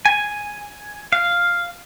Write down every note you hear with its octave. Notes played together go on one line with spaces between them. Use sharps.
G#5
F5